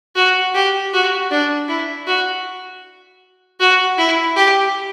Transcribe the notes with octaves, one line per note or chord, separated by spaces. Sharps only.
F#4
G4
F#4
D4
E4
F#4
F#4
E4
G4